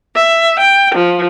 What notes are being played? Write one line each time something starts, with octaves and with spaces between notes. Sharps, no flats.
E5
G5
F3